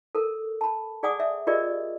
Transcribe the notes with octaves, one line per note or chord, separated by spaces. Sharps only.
A4 A#4
A5 B5
G#4 D5 F#5 G#5 D6 D#6
E5
F4 G4 G#4 A#4 D5 D#5